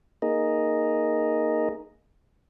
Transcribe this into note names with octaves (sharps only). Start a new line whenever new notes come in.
A#3 D#4 G#4 A#4 D#5